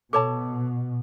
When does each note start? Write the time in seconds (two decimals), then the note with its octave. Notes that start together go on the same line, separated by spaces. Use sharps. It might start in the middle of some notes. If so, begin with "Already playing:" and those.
0.13 B2 A4 C#5 A5 D6